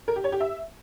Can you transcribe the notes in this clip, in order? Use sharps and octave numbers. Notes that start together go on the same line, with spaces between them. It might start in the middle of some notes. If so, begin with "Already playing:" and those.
A#4
G4
C#5
G4
E5